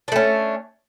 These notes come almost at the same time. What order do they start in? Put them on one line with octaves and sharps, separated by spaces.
D4 A3 C#4